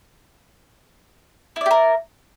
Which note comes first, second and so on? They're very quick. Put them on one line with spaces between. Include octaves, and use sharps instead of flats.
E4 D5 G4 A#4